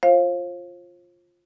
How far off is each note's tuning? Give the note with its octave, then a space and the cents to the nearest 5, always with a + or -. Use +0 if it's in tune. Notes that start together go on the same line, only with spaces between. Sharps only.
F4 +0 C5 +40 F5 +0